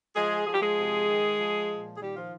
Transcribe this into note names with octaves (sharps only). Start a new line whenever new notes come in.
F3 G#3 G#4
F3 G#4
G4
G#3 G#4
C3
D#3
F3
A#2
G#4
D#3 G3 G4
F3 F4